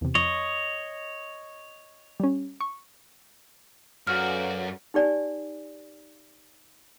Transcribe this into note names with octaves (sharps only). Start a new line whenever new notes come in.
E2 C3
F2 C#5 D#5
G3 C#4
C#6
F#2 F#4 A4 B4 D5 F5 F6
D#4 G4 D5 G#5